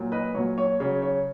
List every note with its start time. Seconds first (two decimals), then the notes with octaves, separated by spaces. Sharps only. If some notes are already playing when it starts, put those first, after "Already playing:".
Already playing: A#2 F#3
0.12 B4 D#5
0.34 A#2 F#3 C#5
0.58 C#5
0.80 C#3 F#3 C#5
1.02 C#5